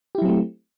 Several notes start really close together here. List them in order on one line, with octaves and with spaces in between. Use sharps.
G4 E4 F#3 C4 A3